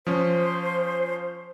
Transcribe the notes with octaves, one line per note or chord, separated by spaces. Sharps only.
F3 C#4 C5